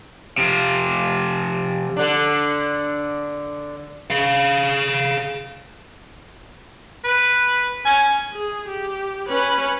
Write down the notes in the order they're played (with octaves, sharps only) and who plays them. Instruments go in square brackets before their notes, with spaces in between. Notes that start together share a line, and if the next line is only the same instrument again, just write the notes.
[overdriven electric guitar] C3 F3
[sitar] D3 D4
[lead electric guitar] G#4 F5
[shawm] B4
[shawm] C#4 [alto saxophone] G#5
[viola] G#4
G4
C#4 B4